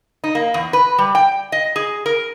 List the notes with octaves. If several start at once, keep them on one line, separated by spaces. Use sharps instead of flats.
D#4
A#3
E2
B4
G3
G5
D#5
G#4
A#4